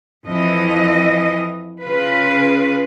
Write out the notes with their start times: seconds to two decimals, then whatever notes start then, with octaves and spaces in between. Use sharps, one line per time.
0.24 F2 E3 D#5
1.82 C#3 F4 B4